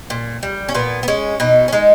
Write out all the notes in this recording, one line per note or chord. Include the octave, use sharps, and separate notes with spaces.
A#2
G3
C#4
A#2 B3
B3
G#3 C#4
B2 D#4
C#4
G#3 D#4